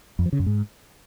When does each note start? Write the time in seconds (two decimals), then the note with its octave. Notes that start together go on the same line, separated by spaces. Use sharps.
0.19 F2
0.26 F3
0.33 C#3
0.39 F#2
0.46 G#2